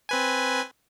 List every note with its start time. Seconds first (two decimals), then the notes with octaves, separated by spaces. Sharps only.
0.09 C4 B4 G#5